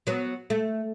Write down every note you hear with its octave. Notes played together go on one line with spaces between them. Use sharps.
F#3 B3
A3